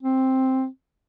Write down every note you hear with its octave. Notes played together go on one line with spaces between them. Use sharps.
C4